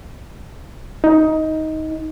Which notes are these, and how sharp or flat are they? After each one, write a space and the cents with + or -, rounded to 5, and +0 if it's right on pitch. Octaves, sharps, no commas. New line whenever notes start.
D#4 +15